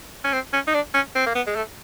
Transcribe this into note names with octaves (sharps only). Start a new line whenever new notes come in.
C#4
C4
C#4
D#4
D4
C#4
C4
A#3
B3
G#3
A3